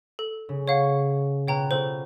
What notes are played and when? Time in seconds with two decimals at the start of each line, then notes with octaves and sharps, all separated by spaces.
0.19 A4
0.49 C#3
0.68 C#5 F5 F#5 C#6 G#6
1.47 B2 F4 C#5 G5 A#5 F#6
1.71 B2 F4 A4 C5